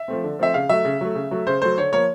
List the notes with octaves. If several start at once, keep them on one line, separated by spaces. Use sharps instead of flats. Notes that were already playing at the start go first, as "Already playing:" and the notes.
Already playing: E5
F3 A3 C4
D3
F3 A3 C4 E5
C#3 F5
F#3 A3 E5
C#3
F#3 A3
C#3
F#3 A3
C#3 C5
F#3 A3 C5
D3 C#5
F3 A#3 C#5